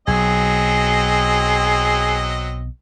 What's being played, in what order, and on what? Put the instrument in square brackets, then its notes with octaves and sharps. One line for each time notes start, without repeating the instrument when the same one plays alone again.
[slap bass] B1 [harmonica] F#3 C4 D#5 [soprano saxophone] G#4